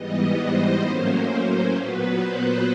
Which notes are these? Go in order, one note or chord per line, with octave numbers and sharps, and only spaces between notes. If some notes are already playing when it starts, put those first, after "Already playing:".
Already playing: G#2 E3 G3 B3 D#5
C5
A2 F#3 A#3 C#4 C5
A#2 F#3 B3 B4
C5